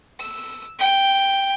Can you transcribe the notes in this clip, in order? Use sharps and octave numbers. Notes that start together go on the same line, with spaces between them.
E6
G5